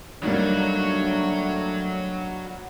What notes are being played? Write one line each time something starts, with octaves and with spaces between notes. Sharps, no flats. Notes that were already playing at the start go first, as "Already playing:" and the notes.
F#3 G3 A3 A#3 D4 D#4 F#4 C#5